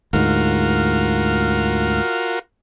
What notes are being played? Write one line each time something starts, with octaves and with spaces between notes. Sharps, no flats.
D2 G#2 F4 F#4 A#4